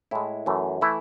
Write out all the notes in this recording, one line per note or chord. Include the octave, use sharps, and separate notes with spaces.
A2 G#3 E4
F#2 E3 A3
E3 A3 E4